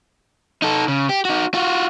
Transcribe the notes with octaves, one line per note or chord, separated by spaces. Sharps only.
D#4 A4
C#3
G4
D#4 F#4
F4 F#4